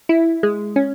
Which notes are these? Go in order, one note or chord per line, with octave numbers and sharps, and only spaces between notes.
E4
G#3
C#4